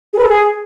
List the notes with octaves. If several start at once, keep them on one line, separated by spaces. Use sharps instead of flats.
G#4
B4
A4
G#4